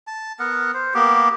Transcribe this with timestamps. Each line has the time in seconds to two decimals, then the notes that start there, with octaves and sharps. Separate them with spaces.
0.07 A5
0.39 B3 A#4 F#5
0.74 C5
0.94 A#3 B3 G4